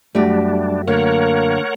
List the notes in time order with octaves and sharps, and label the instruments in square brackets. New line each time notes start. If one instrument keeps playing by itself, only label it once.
[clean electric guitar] F#2 F#4 [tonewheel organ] G3 D4 [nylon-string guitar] A3 G4
[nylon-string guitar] D3 [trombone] A#3 [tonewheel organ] A#4 C#5 F#5